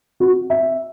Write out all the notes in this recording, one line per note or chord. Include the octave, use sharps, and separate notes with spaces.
F#4
E5